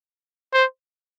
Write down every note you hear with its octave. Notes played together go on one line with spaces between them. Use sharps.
C5